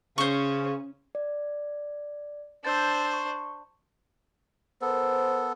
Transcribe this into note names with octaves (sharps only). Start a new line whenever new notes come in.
C#3 C#4 C5 C#6
D5
D4 C5 E6 G6 A6
C#6
B3 A4 A#4 C5